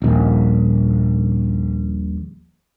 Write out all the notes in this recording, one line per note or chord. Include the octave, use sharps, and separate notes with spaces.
D#1 A#1